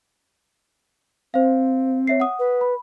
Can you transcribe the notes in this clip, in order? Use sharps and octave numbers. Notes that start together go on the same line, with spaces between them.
C4 C5 F5
C#5 E5 C7
F#5 D#6
B4
B5